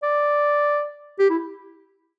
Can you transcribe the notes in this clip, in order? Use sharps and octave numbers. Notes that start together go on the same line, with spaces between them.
D5
G4
E4